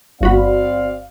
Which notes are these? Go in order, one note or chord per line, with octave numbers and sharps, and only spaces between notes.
G1 C4 F#4 D5 F5 B5